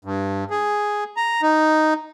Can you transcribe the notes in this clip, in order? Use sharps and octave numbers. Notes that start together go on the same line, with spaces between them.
G2
G#4
A#5
D#4